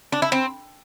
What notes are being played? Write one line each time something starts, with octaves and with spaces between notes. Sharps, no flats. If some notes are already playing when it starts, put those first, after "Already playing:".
D4
E4
C4